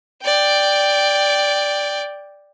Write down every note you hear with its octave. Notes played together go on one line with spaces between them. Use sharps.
D5 G5